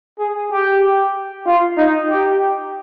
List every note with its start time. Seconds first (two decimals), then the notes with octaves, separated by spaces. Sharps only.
0.19 G#4
0.52 G4
1.46 F4
1.77 D#4
2.10 G4